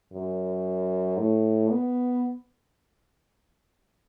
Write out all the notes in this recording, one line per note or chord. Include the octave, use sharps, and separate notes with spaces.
F#2
A2
B3